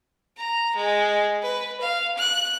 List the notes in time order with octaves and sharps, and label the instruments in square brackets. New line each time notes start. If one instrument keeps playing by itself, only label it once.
[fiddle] A#5
G#3
B4
F5
F#6